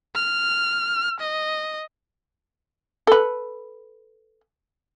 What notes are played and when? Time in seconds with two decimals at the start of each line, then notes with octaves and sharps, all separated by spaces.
0.15 F6
1.20 D#5
3.07 A4 B4